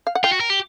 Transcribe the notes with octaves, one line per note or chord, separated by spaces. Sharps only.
F5
F#5
F4 G5
F#4
A#4
G4